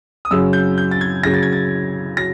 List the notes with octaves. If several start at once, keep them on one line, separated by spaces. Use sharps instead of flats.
D#6
F#2 C#3 F#3 E6
G6
G6
A6
G#6
F#2 C#3 F#3 A#6
A6
G#6
A6
F#3 A#6